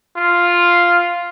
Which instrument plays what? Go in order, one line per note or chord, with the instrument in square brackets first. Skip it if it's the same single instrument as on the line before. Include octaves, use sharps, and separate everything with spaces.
[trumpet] F4